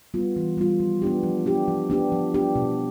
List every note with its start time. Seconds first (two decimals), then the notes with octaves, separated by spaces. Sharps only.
0.14 G3 B3 F4
0.36 E3
0.57 G3 B3 F4
0.80 F3
1.02 B3 D4 G4
1.23 F3
1.46 B3 D4 G4
1.68 F3
1.90 B3 D4 G4
2.12 F3
2.34 B3 D4 G4
2.56 B2